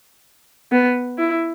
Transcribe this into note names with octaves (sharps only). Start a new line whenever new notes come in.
B3
E4